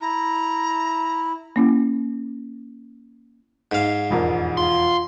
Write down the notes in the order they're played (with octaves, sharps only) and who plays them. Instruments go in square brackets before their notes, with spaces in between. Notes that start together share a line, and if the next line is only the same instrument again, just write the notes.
[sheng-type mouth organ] E4 [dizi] A#5
[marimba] A#3 C#4 E4
[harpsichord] G#2 F5
[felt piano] E1 F2 A#4
[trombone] F4 [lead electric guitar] C6